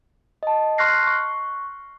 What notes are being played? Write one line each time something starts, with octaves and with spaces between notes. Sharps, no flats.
D#5 A5
C6 C#6 F6 F#6 A#6 C7
C#6